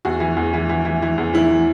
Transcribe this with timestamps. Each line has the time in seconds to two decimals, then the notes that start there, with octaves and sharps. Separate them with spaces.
0.05 E2 F#4
0.20 E3
0.37 E2
0.54 E3
0.69 E3
0.85 E3
1.02 E3
1.18 E2
1.34 E3 E4
1.51 E3